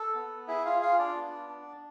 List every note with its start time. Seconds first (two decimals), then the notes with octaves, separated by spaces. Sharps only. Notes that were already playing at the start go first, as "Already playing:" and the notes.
Already playing: A4
0.15 B3
0.48 E4 G#4 E5
0.65 F4 F5
0.82 F4 F5
0.99 D4 D5
1.16 B3
1.49 D4